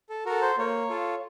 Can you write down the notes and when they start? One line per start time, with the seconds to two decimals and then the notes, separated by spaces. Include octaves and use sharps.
0.09 A4
0.26 F#4 A4 A#4
0.41 C5
0.58 A#3 C#5
0.90 F4 A4